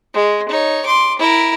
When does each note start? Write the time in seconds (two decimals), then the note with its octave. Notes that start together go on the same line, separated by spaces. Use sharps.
0.14 G#3
0.49 D#4 C#5
0.85 C6 D6
1.19 E4 A#4